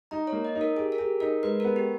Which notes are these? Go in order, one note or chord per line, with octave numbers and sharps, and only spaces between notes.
D#4 A#5
C#5
A#3
D#5
D#4
A#4
G4 G#4
A#4
G4 G#4
D#4 A#4
G#3 B4
A#4
B3
G4